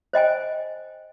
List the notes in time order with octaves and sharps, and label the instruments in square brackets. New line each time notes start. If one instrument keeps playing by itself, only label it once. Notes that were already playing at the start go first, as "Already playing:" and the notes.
[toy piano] C5 D#5 G5 G#5